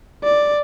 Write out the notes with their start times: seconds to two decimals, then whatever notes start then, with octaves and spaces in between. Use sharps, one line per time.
0.25 D5